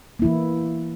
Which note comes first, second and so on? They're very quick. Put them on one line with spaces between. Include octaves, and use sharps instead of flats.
A#3 E4 E3